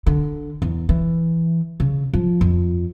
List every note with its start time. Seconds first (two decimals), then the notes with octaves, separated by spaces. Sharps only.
0.07 D3
0.62 E2
0.89 E3
1.80 C#3
2.13 F3
2.41 F2